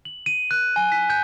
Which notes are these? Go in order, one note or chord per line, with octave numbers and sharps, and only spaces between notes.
F#7
D#7
F#6
G#5
B6
G6